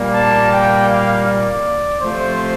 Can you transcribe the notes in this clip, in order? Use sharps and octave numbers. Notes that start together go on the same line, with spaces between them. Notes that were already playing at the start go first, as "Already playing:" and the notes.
Already playing: A#2 G3 A#3
A5
G5
F5
D5
C3 F3 A3 C5